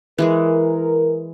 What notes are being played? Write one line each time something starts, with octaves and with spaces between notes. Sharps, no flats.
E3 G#3 G#4 A#4